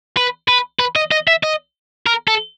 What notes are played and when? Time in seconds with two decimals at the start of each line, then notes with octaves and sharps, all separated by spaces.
0.17 B4
0.48 B4
0.80 B4
0.96 D#5
1.11 D#5
1.27 E5
1.43 D#5
2.06 A#4
2.28 A4